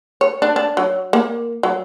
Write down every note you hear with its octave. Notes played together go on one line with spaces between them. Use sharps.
C#5
D4
D4
F#3
A#3
F#3